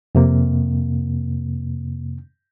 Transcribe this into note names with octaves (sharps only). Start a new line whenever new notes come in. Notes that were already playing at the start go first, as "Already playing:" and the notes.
F2 C3 A#3